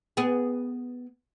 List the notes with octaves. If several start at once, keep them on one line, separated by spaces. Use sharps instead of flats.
B3 G#4